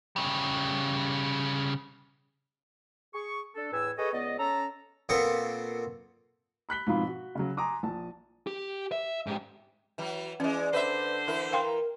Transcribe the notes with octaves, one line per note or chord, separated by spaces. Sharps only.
C#3 G3
G#4 C#6
D4 A4
E2 A2 B4 G#5 E6
G#4 A4 B4 C#5 D#5
C#2 B3 D5 D#5
C#4 A4 A#5
A#2 B3 C4 A4 C#6
B5 F#6 B6 G7
G#2 B2 F3 C4 F4 B5
F#4
C#3 F#3
G#5 A#5 C6 D6 D#6
A#1 A5
G4
E5
G#2 G4
E3 F#3
E3 G#3 C#4 D5
D3 B4 C5 E5
E3 E4 A#4
A#4 F5 G5 C6